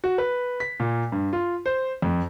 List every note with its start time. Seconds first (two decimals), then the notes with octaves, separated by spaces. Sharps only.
0.04 F#4
0.18 B4
0.60 B6
0.80 A#2
1.12 G2
1.33 F4
1.66 C5
2.02 F2